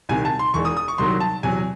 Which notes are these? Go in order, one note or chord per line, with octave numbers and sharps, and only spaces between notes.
C2 C3 D#3 G#5
A5
C6
E1 E2 D#3 G#3 C#6
D#6
D#6
C#6
C2 C3 D#3 F#3 C6
A5
E2 C3 F#3 G#5